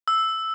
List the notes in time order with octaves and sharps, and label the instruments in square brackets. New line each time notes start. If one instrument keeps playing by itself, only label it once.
[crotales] E6